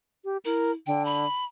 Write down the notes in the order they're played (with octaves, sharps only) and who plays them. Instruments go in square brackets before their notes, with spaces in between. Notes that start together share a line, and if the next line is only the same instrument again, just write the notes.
[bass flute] G4
[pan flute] E4 [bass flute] A#4
[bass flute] D3 [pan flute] G5
[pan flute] B5